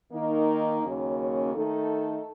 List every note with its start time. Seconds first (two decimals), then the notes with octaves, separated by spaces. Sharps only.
0.12 D#3 A#3 D#4
0.83 D#2 C#3 F#3 A#3 C#4
1.53 D#3 A3 D#4 A4